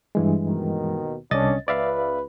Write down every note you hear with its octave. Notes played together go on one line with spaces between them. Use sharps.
G2 E3 G#3
D#2 B2 D#3
C2 D3 C#4 D4 D#5 A6
C#2 B4 D5 E5 F5